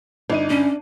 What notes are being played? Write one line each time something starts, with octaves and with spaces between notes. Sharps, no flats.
G1 D4 D#4 D#7
C#4 D4